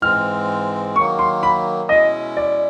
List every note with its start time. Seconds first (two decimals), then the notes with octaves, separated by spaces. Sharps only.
0.02 G#2 E3 G#3 C4 F6
0.96 D#3 F#3 A#3 C#6
1.19 C6
1.43 B5
1.89 B2 G#3 C#4 E4 D#5
2.37 D5